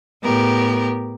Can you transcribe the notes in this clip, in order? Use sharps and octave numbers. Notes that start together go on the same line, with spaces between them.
A2 B3 G4 A#4